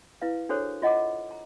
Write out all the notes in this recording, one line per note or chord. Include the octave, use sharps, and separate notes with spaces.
E4 B4 F5
D4 F#4 G#4 A4 C5 C#5
F4 D#5 F#5 A#5 D6
A#5